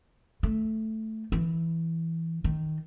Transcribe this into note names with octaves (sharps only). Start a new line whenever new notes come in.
A3
E3
D#3